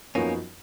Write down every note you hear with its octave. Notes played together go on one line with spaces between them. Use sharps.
F#2 F3 A#3 B3 C#4 D#4 F#4